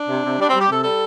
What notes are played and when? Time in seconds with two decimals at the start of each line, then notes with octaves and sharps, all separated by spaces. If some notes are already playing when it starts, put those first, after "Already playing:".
Already playing: D4
0.08 C3
0.23 C3
0.38 G3 D4
0.49 G3 C4
0.61 G4
0.69 C3 A4
0.84 G3 A4